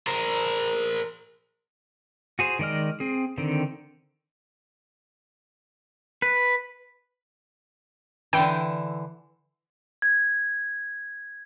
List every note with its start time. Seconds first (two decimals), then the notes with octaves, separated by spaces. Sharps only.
0.07 A#4 C5
2.39 F#4 G#4 C5
2.59 D#3 G#3 D5 D#5 F6
3.00 C4 G#4
3.38 D3 D#3 C4
6.22 B4
8.33 D3 E3 G5
10.02 G#6